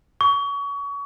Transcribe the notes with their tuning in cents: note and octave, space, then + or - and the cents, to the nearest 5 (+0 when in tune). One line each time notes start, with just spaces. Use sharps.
C#6 +30